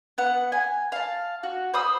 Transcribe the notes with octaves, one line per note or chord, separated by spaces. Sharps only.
B3 F#5
G#5
F5 A5
F#4
C5 B5 D#6 E6